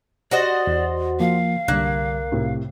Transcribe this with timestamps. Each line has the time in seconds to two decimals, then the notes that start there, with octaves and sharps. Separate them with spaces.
0.31 F#4 G4 C5 D5 D#5
0.67 E2
1.20 F3 A#3 F5
1.68 C2 G2 D3 A#3 F#6
2.32 A2 C3